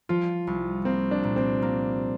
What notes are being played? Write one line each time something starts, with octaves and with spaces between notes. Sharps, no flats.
F3 F4
C2
A#3 C4
D4
A#2
C4
A#3